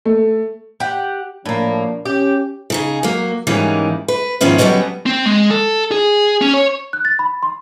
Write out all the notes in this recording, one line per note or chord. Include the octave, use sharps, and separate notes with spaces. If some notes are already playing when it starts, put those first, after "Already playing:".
A3
G4 F#5
A2 F3 A#3 D4 A#4
C#4 G4
C#3 D#4 G#4
F#3 A#3
G#2 E3 G3 A#3 C#4 D#4
B4
G#2 D#3 F3 B3 C#4 E4
D2 F#3 G3 B3 C#4 D#5
C4
G#3
A4
G#4
C#4
C#5
F#6
A6
B5
C6